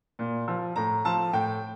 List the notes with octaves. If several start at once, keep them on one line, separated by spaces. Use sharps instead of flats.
A#2
F3
A2 A#5
F3 A5
A2 G5